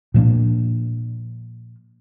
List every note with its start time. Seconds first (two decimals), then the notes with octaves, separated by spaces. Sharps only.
0.14 A#2 F3 A#3 D4